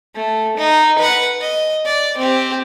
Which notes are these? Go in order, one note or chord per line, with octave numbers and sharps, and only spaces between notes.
A3
D#4
B4 F#5
D#5
D5
C4 G4